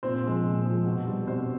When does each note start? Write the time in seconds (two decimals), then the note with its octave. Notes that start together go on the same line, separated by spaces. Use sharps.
0.03 A#2 C4 C5
0.24 F3 G#3
0.45 A#2
0.65 F3 G#3
0.86 B2
1.06 G3
1.27 B2 C4 C5